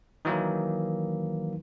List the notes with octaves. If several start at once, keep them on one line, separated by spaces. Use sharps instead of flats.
D#3 E3 F#3 A#3